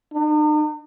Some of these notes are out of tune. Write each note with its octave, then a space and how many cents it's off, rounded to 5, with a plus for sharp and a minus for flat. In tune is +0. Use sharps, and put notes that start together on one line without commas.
D#4 -45